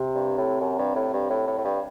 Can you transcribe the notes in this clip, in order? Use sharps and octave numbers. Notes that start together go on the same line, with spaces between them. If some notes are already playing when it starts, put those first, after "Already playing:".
Already playing: C3
G2
A2
F#2
G2
A2
G2
A2
A2
A2
G2